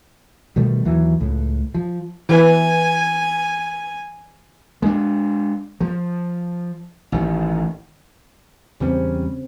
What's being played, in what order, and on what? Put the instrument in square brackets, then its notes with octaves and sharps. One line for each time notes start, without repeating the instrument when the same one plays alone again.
[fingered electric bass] B2 D#3 G3 A3
D#2 E3 F#3
C#2 A2
F3
[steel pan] E3 B4 [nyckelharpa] G#5
[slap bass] G#3 D4
F3
A1 D#3
[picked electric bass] E2 G3 C#4 [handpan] C#3 C4